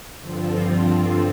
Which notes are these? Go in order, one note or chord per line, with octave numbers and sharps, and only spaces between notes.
G2 D3 F3 C4 F4